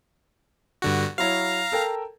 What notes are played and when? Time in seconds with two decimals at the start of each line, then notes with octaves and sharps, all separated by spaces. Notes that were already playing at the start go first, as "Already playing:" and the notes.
0.82 G2 D3 F#4
1.18 F#3 E4 C#5 F5 A#5
1.72 A4 A#4 G5